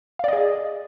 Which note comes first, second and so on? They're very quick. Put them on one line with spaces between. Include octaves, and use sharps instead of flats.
F5 D5 D#5 G#4